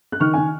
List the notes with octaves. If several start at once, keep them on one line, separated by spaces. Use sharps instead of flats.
F#6
D#3 C#6 F6
D#3 G#5